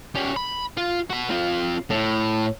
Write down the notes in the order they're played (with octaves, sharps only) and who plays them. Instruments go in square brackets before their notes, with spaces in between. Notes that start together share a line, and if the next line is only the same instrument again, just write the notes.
[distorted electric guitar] G3 C#4
B5
F4
F#4 B5
C4 F4
A2